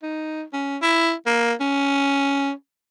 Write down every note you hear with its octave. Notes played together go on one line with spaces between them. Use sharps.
D#4
C#4
E4
A#3
C#4